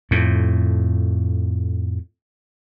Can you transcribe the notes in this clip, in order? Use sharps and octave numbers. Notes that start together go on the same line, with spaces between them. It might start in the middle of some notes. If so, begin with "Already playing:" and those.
F2 A2